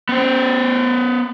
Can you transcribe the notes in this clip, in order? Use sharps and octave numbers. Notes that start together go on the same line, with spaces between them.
B3 C5